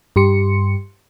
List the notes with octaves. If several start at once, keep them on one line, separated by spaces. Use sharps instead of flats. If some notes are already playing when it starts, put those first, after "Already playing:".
G2 G4 C6 C#7